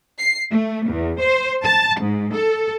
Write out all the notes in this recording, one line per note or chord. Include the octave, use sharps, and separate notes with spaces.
C7
A3
E2
C5
A5
G#2
A4